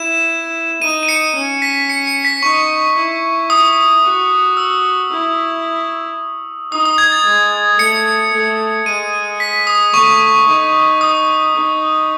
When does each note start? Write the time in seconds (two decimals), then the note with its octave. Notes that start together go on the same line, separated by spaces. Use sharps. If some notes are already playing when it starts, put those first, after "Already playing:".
Already playing: E4 E7
0.82 D#4 D#7
1.03 D#7
1.09 C#7
1.35 C#4
1.62 B6
1.90 C#7
2.07 C#7
2.25 B6
2.43 D#4 C#6
2.96 E4
3.50 D#6
4.03 F#4
4.57 E6
5.10 E4
6.72 D#4 D#6
6.86 D#6
6.98 G#6
7.12 A6
7.25 G#3
7.79 A3 C#7
8.33 A3
8.86 G#3 D#7
9.40 B6
9.67 D#6
9.94 A3 C#6
10.48 D#4
11.01 D#6
11.55 D#4